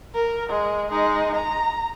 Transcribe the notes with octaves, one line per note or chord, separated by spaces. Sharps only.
A#4
G#3
G#3 D#4
A#5